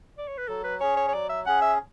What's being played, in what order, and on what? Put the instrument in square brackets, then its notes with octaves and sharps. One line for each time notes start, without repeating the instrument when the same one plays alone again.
[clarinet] D5
C#5
B4
[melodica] F#3 [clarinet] A4
[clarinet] B4
[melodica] C#4 G#4 [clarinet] C#5
[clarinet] C#5
C#5
[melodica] F#3 [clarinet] D5
[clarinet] E5
[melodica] C#4 G#4 [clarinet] F#5
[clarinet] E5